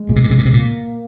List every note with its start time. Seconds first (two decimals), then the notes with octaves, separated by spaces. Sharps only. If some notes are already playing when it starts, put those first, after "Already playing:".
Already playing: G#3
0.09 A#2
0.16 C3
0.24 A#2
0.31 C3
0.38 A#2
0.45 C3
0.53 A#2 A#3